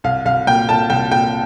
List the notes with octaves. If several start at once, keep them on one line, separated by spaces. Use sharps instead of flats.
C2 F5
C2 F5
A#2 G5
A#2 A5
C2 G5
A#2 G5